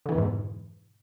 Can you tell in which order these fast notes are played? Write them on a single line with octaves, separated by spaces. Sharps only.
D3 E3 B2 F2 G#2